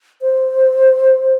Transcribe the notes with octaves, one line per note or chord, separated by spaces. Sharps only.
C5